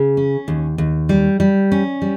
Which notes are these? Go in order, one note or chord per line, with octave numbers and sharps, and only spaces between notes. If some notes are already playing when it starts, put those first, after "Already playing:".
Already playing: C#3
C#4
D#2
D#2
G3
G3
C#4
G3